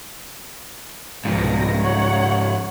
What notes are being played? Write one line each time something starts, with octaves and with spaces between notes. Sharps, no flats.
C2 G#2 B2 F3 A#6
C#5 F#5